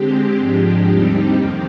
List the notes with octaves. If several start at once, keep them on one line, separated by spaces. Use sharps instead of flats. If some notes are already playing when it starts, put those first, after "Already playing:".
Already playing: D3 G#3 C4 G4
G#2 F3 G#3 D4 G4
D#2 D3 G3 C4 D#4
F2 C3 D#3